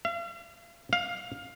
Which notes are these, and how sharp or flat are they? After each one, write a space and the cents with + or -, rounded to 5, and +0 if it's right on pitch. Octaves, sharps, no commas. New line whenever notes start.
F5 -40
F5 +15